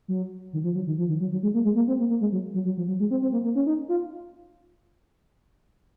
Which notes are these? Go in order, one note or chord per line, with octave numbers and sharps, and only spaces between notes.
F#3
D#3
F3
F#3
D#3
F3
D#3
F#3
F#3
G#3
A#3
G#3
A#3
C4
A#3
A#3
G#3
F#3
F#3
F#3
F3
F#3
G#3
C4
C4
A#3
A#3
C#4
D#4
F4